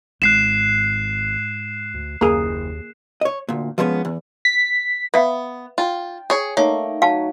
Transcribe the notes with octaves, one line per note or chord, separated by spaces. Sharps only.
G#1 G#2 F#6 C7 E7
D2
F#1 D#2 A#3 G#4
C#5 D#5
D2 A#2
F3 G3 G#3 B3 C#4
E2
B6
B3 B4 E5 F5
F4 G5
G#4 C#5
A3 A#3 D#4 C#5
F#3 F5 A5